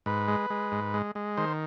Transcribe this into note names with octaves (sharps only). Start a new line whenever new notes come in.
G#2 B4
G#3
G#3
G#2
G#3
G#3
D#3 C5